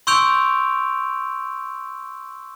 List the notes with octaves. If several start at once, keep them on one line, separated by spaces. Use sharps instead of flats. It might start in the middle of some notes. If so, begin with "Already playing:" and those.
C6 C#6 E6 G6 D7 F7